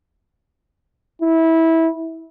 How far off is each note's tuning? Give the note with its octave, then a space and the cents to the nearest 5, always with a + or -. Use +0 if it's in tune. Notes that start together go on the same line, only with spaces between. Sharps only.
E4 -20